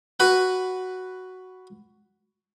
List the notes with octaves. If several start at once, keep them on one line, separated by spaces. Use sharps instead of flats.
F#4 B4 F#5